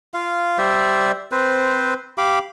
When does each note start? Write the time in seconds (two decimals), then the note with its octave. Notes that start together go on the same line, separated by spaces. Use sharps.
0.14 F4 F5
0.58 G3 C5 D5 E5
1.32 C4 B4 C5
2.18 G4 F5 B5 D6